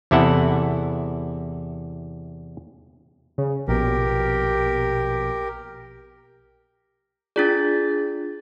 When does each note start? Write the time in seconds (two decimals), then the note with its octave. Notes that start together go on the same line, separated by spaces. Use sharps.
0.11 E2 C3 E4 A4 F#5
3.38 C#3
3.68 A#1 B2 G4 A#4
7.36 D4 F4 G#4 D5 A6